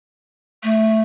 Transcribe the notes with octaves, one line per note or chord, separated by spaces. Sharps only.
A3